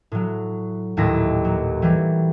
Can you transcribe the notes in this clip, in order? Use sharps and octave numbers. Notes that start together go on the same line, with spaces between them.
A2 F#3
D#1 D#2 A2 E4 A#6
F#3
E3 F#3 G3